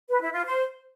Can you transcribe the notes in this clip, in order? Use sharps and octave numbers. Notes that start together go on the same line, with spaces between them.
B4
E4
F4
C5